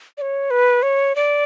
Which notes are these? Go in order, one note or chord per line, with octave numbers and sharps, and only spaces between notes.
D5
C#5
B4
C#5
D5